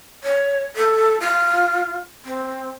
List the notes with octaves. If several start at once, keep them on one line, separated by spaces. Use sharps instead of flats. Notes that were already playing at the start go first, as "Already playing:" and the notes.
C#5
A4
F4
C4